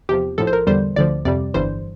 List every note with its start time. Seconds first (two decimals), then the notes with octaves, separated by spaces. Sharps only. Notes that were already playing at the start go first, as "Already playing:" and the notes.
0.09 E2 C3 F3 G4
0.38 A#1 A2 F3 A4
0.47 C5
0.53 A#4
0.67 E2 D3 G3 C5
0.96 D2 D3 F3 D5
1.25 F2 C3 G3 D5
1.54 G1 G2 E3 G3 C5